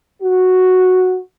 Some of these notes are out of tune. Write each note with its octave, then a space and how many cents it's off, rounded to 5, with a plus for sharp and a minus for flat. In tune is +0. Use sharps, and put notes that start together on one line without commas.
F#4 -5